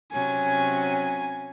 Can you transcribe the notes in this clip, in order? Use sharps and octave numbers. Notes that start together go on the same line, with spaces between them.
C3 F#3 C#4 G#5